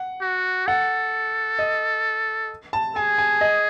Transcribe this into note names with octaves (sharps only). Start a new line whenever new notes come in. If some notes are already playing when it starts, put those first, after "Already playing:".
Already playing: F#5
F#4
A4 F#5
D#5
A5
G#4 G#5
G#5
D#5